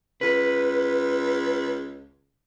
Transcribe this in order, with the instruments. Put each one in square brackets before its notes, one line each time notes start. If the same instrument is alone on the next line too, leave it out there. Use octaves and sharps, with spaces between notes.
[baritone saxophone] C#2 [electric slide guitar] B4